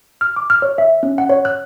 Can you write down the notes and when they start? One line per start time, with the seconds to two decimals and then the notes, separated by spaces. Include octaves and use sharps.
0.21 F6
0.36 D6
0.50 F6
0.62 C#5
0.78 E5
1.03 C#4
1.18 F#5
1.29 C#5
1.45 F#6